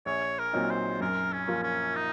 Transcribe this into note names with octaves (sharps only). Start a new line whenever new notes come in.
A#1 C#5
A#4
A#2 F#3 C4 D#4
C5
F#2 A#4
C#4
F3 A#3 F4
C#4
D#4